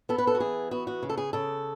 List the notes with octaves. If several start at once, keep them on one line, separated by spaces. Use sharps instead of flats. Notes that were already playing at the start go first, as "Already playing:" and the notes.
B3 A4
B4
A4
F#4
E3 G#4
B3 F#4
F#4
C#3
A4
G#4
C#3 A4